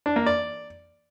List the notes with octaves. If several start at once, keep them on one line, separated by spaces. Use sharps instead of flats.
D4
A#3
D5